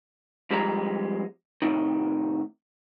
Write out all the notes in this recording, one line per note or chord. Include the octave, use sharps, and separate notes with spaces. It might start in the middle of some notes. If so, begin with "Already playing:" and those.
F2 G3 G#3 A#5
A2 C3 D#3